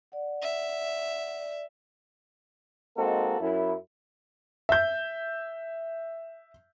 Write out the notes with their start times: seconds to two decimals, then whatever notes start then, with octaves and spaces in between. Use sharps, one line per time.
0.12 D5 F#5
0.42 E5
1.37 D5
2.96 G#3 A#3 C4 D#4 F#4 A4
3.40 F#2 E4
4.69 E5 G6